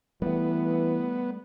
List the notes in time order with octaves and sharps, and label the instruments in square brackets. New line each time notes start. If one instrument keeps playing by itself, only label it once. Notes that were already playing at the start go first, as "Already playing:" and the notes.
[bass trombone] E3 [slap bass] G3 A3 [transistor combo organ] B3